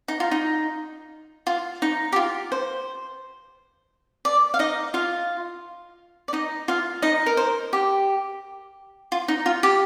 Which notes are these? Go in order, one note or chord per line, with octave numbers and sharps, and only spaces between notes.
D#4
F4
D#4
F4
D#4
G4
F4
C5
D5
F5
D#4 D#5
F4 F5
D5
D#4 D#5
F4 F5
D#4 D#5
A#4
C5
G4
F4
D#4
F4
G4